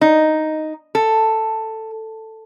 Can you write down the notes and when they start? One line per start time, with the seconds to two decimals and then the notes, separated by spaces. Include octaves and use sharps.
0.01 D#4
0.95 A4